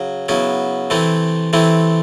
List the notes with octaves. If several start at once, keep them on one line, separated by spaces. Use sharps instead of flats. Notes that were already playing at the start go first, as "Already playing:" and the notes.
Already playing: C#3 F#3
C#3 F#3 B3 E4
C3 E3 A3 C4 E4
C3 E3 A3 C4 E4